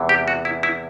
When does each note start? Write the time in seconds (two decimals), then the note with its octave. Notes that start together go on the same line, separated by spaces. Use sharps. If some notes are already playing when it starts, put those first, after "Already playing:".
Already playing: E2 C3 E3 G#3
0.09 G4
0.28 F#4
0.45 E4
0.63 E4